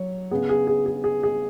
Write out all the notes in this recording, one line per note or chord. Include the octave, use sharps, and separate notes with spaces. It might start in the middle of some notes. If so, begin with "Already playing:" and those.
Already playing: F#3 C#5
C#3 B3 G#4
G#4
G#4
G#4
G#4
G#4